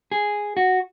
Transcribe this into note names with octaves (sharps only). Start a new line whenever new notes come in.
G#4
F#4